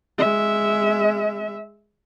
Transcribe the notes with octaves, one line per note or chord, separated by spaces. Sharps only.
G#3 E5